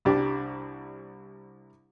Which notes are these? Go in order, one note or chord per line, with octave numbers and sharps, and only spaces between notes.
C2 G3 D4 G4